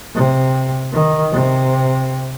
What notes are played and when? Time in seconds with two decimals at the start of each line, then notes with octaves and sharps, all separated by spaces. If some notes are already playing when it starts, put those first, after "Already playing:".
0.15 C3
0.92 D#3
1.32 C3